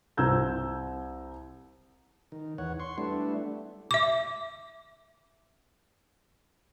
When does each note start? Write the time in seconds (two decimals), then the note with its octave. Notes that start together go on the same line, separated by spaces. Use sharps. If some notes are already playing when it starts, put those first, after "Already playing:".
0.17 C2 C4 A#5 E6 G6 G#6
2.32 D#3
2.58 E2 C#5 F#5
2.80 C6 C#6
2.98 G3 A3 B3 D4 E4
3.91 E5 D6